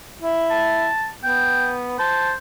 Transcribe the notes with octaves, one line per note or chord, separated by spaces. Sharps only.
E4
A5
B3 G5
C5 A5